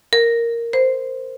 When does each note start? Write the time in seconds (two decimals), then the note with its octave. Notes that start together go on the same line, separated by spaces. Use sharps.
0.13 A#4
0.73 C5